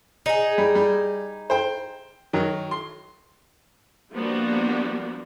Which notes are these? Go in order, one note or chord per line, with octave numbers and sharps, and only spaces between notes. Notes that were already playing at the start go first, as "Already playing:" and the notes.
D#4 G#4
G3
G3
C5 G5
D#3 F#3
C6
F3 G3 A#3 B3 D4 F#4